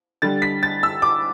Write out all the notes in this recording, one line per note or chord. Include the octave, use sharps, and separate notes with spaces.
D3 G3 A6
B6
A6
E6
D6